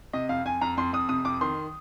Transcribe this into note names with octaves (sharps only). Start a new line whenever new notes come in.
C3 D#5
F2 F5
F2 G#5
F2 A#5
F2 C6
F2 D#6
C3 D#6
F2 D6
D#3 C6